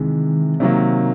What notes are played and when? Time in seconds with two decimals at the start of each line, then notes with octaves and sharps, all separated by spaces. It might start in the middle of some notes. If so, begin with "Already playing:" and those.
Already playing: C3 D#3 E3 G#3
0.60 C3 D#3 F#3 A#3